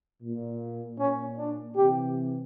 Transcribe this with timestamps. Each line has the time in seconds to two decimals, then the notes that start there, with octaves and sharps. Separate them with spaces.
0.21 A#2
0.98 A#2 C#4
1.38 D4
1.76 C3 E3 G4